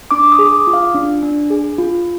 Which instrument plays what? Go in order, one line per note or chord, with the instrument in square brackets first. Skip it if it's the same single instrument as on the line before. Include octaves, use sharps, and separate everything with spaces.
[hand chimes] D4 D6
D#6
G#4
D6
F4
F5
D4
D4
G#4
F4